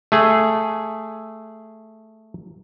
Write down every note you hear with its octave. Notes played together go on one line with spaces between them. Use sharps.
A3 G#4